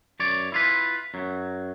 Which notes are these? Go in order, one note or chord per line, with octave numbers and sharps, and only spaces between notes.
F#2 C#5 D5
E4 F4 B4
F#2 F#3